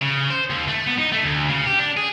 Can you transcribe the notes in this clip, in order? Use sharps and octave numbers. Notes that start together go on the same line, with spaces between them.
C#3
C5
D#2
A3
B3
D#4
A3
D2
C#3
G4
D4
G#4